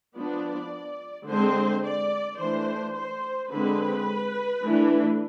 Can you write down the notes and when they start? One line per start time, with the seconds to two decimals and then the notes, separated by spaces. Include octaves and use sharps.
0.15 F3 B3 D4 D5
1.27 D3 G#3 C4 C5
1.84 D5
2.39 E3 A3 D4 C5
2.95 C5
3.51 D3 G#3 C4 B4
4.63 E3 A3 D4